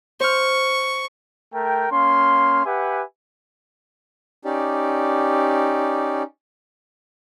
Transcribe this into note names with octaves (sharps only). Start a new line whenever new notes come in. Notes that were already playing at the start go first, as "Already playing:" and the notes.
C5 C#6 F6
A3 A#4 G5
A#3 C#4 F5 C6
G4 B4 E5 F#5 G#5
C#4 D#4 G4 D5